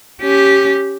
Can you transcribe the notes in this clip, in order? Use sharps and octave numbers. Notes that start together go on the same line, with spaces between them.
C#4 G4